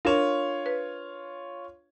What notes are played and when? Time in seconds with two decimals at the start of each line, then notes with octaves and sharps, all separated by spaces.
0.05 D4 F4 A#4 C#5
0.66 B4